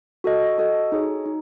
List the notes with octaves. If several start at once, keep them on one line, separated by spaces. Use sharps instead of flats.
F#4 A4 D#5
F#4 A4 D#5
D#4 G#4 C#5
D#4